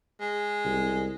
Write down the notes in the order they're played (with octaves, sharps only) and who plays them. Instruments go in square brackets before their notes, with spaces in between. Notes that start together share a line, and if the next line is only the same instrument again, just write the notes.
[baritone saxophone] G#3
[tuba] C2